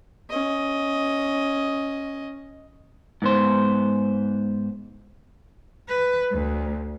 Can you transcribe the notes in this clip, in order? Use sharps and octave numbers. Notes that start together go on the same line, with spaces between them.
C#4 D#5
G#2 B3 C5
B4
D2